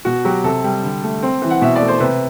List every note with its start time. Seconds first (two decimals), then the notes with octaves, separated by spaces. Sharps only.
0.05 B2 F#4
0.24 F#3 G4
0.44 C3 A4
0.64 G3
0.83 D3
1.03 A3
1.22 C4
1.42 E3
1.50 F#5
1.61 B2 E5
1.76 D5
1.81 A3
1.88 C5
2.00 C3 B4